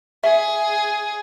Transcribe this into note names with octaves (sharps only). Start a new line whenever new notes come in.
G#4 E5